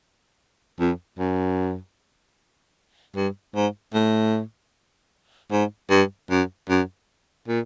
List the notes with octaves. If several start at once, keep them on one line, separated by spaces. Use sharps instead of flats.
F2
F#2
G2
G#2
A2
G#2
G2
F#2
F#2
A#2